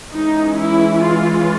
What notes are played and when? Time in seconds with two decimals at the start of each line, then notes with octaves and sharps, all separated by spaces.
0.13 E3 G#3 C#4 D#4
0.57 E4
1.02 F4